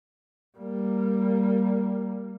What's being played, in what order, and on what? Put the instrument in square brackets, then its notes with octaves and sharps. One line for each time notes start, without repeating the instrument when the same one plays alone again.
[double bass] G3 A#3